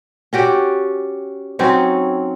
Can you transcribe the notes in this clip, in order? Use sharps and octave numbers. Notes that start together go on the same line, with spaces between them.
C#4 F#4 G4 D5
F#3 C4 C#4 D#4